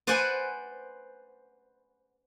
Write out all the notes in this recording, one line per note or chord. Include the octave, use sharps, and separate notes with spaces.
B4 C5 D5 F#5 G#5